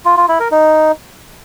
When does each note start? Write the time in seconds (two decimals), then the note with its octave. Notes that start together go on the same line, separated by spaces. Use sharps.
0.05 F4
0.17 F4
0.28 E4
0.40 A#4
0.51 D#4